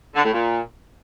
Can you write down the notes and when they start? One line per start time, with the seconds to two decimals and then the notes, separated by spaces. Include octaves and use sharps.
0.15 D3
0.24 A2
0.33 A#2